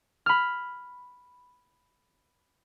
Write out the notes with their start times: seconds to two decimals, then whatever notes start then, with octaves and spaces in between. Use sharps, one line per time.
0.26 B5 F6